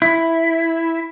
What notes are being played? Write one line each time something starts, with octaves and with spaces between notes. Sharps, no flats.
E4